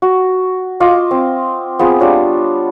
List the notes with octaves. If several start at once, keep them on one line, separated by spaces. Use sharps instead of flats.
F#4
F4 D#5 D6
C4
B3 C4 F4 G#4
G3 D4 F4 C#5